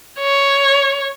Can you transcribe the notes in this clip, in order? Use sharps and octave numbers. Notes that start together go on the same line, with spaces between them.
C#5